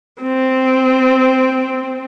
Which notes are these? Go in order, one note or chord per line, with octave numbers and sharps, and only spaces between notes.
C4